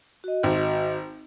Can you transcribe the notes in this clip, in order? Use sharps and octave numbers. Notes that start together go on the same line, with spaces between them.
F#4 D#5
G#1